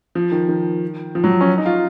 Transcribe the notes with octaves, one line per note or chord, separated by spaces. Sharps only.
F3
D#3
D#3
F3
F#3
C#4
D#4
F4